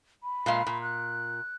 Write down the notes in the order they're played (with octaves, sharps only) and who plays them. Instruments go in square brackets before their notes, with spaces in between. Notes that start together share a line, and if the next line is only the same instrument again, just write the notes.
[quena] B5
[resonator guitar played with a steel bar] A#2 G#3 F5
A#2
[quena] F#6